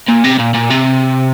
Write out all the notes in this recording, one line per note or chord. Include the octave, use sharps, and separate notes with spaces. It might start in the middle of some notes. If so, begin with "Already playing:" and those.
A#2
C3
A#2
A#2
C3